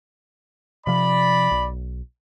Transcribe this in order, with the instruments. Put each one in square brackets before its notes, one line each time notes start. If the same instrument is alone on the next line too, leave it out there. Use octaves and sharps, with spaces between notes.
[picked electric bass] C3 F3 [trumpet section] D5 B5
[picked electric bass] B1